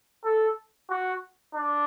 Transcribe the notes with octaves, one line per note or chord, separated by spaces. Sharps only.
A4
F#4
D4